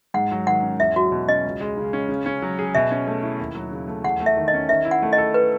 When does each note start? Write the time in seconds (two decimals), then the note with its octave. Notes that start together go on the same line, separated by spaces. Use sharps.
0.14 G#2 F#5
0.31 F#3
0.47 D#3 F#5
0.63 C#4
0.80 E2 E5
0.96 F#3 F#4
1.12 B2
1.28 C#4 D#5
1.45 C#2
1.61 G#3
1.78 C#3
1.93 C#4
2.09 C#3
2.26 C#4
2.42 F#3
2.59 G#4
2.75 B2 E5
2.91 C#4
3.07 A3
3.23 E4
3.39 D#2
3.55 F#3
3.72 C#3
3.88 A3
4.04 E2 F#5
4.20 A3
4.26 E5
4.37 D#3
4.48 D#5
4.54 C#4
4.69 D#3 E5
4.85 E4
4.91 F#5
5.02 A3
5.13 D#5
5.18 A4
5.34 B4